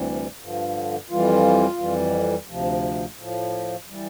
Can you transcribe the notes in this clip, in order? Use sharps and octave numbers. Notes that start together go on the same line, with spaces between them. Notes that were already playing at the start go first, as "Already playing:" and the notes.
Already playing: D2 C3 E3 G3
G2 D3 F3
F2 E3 G3 F4
F2 E3 G3
D2 C3 F3
A2 F3
E3 G3